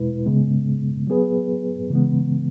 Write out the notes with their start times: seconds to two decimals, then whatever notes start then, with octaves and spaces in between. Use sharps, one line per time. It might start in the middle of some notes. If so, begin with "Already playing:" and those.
Already playing: E2 B2 G#3 E4 B4
0.26 C#3 G#3 B3
1.07 F#3 B3 G#4 B4
1.90 C#3 E3 G#3 B3